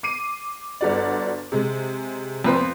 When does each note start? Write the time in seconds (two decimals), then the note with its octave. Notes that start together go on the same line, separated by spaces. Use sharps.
0.03 D6 C7 D#7
0.81 G1 F#4 D5
1.52 C3 G#3
2.44 F2 B4 C5